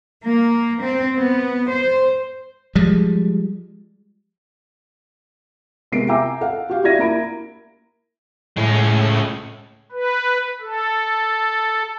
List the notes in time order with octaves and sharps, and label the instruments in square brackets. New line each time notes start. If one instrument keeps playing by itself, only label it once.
[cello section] A#3
C4
B3
C5
[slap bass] F3 G3 G#3
[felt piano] C3 G#3 B3 A#4 C7 D7
E5 G5 G#5 A#5 D6 E6
A4 F5 F#5
F#4 G4 F5
E4 F#4 D5 G#6 A#6 D#7
A#3 E4 A#5 B5 D7
[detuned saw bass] A2 [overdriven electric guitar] G#3 C#4
[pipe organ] B4
A4